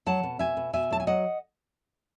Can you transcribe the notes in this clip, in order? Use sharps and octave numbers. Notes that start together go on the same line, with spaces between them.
F#3 F#5 A5
B2
B2 E5 G#5
B2
B2 E5 G#5
F#3 A5
G#5
F#3 D#5 F#5